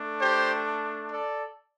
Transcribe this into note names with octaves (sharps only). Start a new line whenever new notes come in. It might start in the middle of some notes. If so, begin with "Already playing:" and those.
Already playing: A3 D4
G4 C5
A4 D5